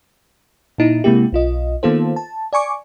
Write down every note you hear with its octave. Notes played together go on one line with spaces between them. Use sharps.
A#2 D#4 E4
C3 G#3 A#3 E4 G4
B1 F4 D#5
D#3 A#3 B3 F4 A4 C5
A5
D5 G#5 C#6 D6